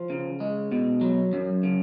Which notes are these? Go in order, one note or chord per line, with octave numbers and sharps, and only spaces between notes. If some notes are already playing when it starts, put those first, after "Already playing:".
Already playing: F3
C#3
G#3
B2
F#3
F#2
C#3